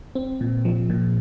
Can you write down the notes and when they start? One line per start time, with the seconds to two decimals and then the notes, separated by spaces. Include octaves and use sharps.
0.15 C4
0.41 A#2
0.65 F3
0.90 A#2